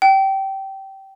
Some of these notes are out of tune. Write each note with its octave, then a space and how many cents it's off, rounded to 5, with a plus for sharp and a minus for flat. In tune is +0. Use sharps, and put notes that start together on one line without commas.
G5 -20